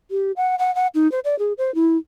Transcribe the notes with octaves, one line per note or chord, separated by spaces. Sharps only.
G4
F#5
F#5
F#5
D#4
C5
D5
G#4
C5
E4